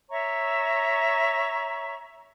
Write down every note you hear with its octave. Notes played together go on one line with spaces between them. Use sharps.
C#5 E5 A#5 C#6